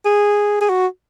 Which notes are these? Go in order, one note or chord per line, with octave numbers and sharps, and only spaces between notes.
G#4
G#4
F#4